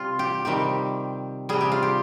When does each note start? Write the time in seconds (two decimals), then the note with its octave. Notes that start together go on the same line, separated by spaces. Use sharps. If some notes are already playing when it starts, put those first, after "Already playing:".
Already playing: C3 G3 F4
0.19 G4
0.45 C3 D#3 G3 G4
1.49 C3 G3 G#4
1.61 G4
1.72 F4
1.83 G4